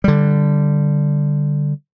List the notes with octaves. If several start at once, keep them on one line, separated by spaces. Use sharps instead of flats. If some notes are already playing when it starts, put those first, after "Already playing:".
D3 G3